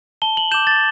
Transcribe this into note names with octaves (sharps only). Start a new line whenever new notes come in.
A5 G7
F#7
D6 G6 E7
A6